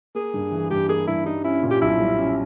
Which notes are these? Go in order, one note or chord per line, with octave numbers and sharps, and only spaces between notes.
A#3 G#4
G2
E3
G2 G4
A#3 G#4
G2 E4
G3 D#4
C#4 E4
A#2
G4
B1 E4
G3
C#4